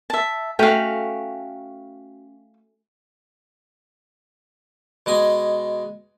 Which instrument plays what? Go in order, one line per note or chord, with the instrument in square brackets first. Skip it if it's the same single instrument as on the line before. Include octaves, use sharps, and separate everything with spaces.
[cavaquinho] E5 A5
[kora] A3 C#4 F#4 [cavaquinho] F5 G5
[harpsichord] B2 G#3 D#5 G#5